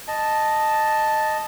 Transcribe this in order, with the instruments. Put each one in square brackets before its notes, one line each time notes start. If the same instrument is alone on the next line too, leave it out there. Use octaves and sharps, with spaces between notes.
[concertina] D#5 A5